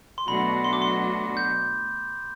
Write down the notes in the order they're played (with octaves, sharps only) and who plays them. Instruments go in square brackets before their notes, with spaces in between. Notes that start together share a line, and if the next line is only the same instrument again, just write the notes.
[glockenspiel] C6
[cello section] B2 F#3 A3 D4 F#4 [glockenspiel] B5
[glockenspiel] C6
D6
C6
G6